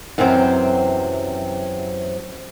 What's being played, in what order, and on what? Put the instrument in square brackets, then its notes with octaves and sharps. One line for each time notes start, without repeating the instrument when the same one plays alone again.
[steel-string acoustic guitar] F#2 C3 E3 F#3 C4 C5